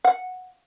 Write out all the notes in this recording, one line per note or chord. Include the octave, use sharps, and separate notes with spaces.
F#5